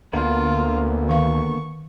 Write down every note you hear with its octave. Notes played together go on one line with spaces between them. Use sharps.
D2 D3 A#3 B3 F4
D#3 F5 C#6